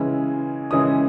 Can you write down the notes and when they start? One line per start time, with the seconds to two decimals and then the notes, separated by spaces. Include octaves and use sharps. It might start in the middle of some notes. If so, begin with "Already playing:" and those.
Already playing: C#3 E3 G#3 C#4
0.71 C#3 E3 G#3 C#4 D#6